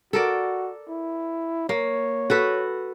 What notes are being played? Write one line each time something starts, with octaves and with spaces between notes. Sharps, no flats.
F#4 A4 A#4 D5
E4
A#3 C#5
F#4 A4 B4